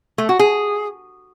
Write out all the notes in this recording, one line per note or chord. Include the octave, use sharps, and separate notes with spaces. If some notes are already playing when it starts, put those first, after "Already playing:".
A3
F#4
G#4